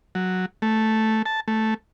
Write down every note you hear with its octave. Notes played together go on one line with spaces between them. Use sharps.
F#3
A3
A5
A3